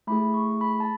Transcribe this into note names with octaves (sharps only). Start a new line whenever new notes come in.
A3 E4 G#4 B5
C#6
B5
A5